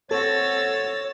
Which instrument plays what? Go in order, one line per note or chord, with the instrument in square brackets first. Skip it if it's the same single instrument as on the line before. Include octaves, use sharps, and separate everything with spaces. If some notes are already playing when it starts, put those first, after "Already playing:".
[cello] C4 F#4 [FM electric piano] A4 [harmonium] C#5 [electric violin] E6 A6